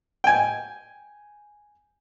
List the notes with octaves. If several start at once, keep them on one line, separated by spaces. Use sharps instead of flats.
G5 G#5